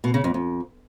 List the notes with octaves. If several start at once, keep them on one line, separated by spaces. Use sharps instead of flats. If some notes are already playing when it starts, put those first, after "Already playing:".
B2
C#3
F2
F2